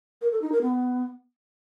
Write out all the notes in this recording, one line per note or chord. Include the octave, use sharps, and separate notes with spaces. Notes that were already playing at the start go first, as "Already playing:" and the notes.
A#4
A4
D#4
A#4
B3